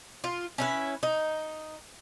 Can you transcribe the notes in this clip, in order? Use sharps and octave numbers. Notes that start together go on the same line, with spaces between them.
F4
C#4 E4 B4
D#4